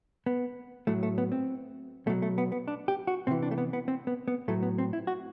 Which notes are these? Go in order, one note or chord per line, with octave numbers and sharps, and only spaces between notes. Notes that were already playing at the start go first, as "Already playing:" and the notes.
B3
A2 F#3 A3
A3
B3
C4
B2 F#3 A3
A3
B3
B3
D4
G4
F#4
C3 E3 C4
D4
A3
B3
B3
C4
B3
B3
A2 F#3 A3
B3
C4
E4
F#4